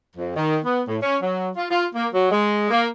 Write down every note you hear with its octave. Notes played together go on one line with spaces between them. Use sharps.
F2
D#3
B3
A2
C#4
F#3
F4
F4
A#3
F#3
G#3
A#3